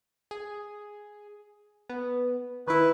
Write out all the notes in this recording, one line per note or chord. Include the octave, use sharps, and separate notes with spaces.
G#4
B3
D#3 E4 B4